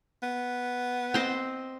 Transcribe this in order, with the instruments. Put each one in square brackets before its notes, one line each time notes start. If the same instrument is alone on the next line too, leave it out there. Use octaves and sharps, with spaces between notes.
[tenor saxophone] B3
[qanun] C4 C5 D#5